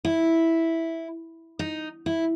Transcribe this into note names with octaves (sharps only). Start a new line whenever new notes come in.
E4
D#4
E4